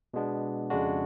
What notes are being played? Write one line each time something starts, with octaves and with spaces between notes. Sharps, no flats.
B2 G#3 B3 D4
F2 C#3 G#3 D4 F#4